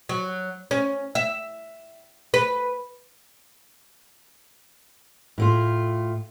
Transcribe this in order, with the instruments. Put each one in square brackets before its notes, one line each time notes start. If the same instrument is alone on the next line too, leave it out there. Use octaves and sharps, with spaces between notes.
[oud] F#3
C#4
E5
B4
[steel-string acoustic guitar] A2 A3 F4